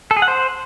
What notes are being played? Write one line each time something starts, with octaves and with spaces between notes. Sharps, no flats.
A4
G#4
F#5
C5